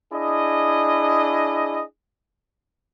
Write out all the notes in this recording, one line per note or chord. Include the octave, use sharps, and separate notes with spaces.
D4 E4 G#4 D#5